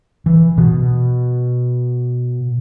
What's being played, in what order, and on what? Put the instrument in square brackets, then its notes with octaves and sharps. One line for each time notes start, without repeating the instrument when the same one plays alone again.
[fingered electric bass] E3
B2